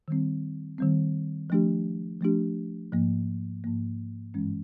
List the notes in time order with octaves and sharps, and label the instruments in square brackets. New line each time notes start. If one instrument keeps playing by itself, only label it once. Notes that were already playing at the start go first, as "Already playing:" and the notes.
[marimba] D#3 G3 C4
D#3 G3 C4
F3 A3 D4 G4
F3 A3 D4 G4
G#2 F3 A#3
G#2 F3 A#3
G2 E3 G#3 C#4